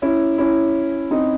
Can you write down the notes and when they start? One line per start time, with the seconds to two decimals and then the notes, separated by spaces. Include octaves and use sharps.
0.02 C#4 E4
0.38 C#4 E4
1.11 C4 D#4